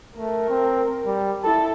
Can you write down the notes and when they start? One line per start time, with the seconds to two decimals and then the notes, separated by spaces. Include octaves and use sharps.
0.17 A3 A#4
0.49 C4
1.05 G3
1.44 E4 A4 A5